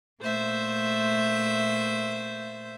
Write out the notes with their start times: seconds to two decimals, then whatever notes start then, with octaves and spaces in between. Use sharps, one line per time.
0.21 A#2 A3 C5 E5 G6